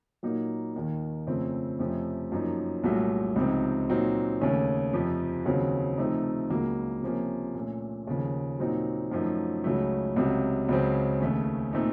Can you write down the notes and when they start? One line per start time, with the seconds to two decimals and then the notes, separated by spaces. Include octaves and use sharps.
0.23 A#2 F#3 A#3 D#4
0.74 D#2 D#3 A#3
1.27 F2 C#3 F3 A3 C4
1.79 F2 C3 F3 A3 C#4
2.32 F#2 F3 A#3 D#4
2.84 C2 A#2 F#3 A3
3.36 C#2 C3 F3 C4 D#4
3.89 A#2 F#3 C4 D#4
4.41 D#2 C#3 A3 C#4
4.93 F2 C3 F3
5.46 D#2 C#3 F#3 C4
5.98 C3 F3 A3 C4 D#4
6.50 C#2 C#3 F#3 A#3
7.03 C3 F3 A#3 C#4
7.55 A#2 A3 C#4
8.07 D#2 C#3 F3
8.59 A#2 F#3 C4 D#4
9.12 F#2 F3 A3 D#4
9.64 C#2 C#3 F#3 A3
10.16 C#2 C3 F#3
10.69 C#2 C#3 F#3 C4
11.21 D#2 C#3 A3 C#4
11.73 A#2 A3 C4 D#4